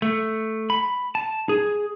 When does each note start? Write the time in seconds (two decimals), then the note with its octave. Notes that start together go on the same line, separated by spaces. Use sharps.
0.02 A3
0.70 B5
1.15 A5
1.49 G#4